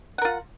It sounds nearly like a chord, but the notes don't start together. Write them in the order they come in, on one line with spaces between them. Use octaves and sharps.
F#5 A#4 F4